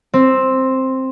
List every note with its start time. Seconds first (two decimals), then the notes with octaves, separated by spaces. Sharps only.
0.14 C4